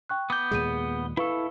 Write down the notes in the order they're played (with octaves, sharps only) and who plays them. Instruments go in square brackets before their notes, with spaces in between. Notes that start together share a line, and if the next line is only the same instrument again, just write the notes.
[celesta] G5 C#6 F#6
[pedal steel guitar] B3 G6 [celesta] D6
[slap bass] D#2 A#2 G#3 [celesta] G#4 D#7
[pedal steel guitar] E4 A4 [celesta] B4 F5 C#6